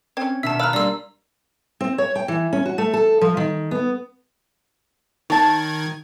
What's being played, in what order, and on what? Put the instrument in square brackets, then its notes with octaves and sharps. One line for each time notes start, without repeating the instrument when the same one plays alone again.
[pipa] C4 C#4 [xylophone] G#6
[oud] B2 D#3 [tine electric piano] D4 E5 B6 [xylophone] A5 E6
[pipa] F5 [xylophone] A#5 E6 [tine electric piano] B5 F#6
[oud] G3 A#3 [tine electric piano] D4 C6 [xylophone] D5 E6
[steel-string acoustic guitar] C4
C#5
G5
E3
C#4
F#4
A3
A4
F3
D#3
B3
[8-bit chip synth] D#3 G#6 [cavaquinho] C#5 A5